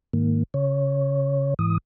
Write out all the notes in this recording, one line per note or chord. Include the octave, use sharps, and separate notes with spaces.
G#2 D#3 A#3
C#3 C#5
G#2 E3 D#6